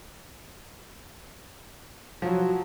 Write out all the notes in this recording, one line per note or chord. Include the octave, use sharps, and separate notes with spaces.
F3 F#3